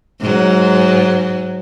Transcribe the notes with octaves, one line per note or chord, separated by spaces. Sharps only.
G#2 F#3